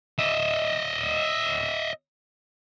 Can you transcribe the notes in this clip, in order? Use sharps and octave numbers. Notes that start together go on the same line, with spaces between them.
D#5 E5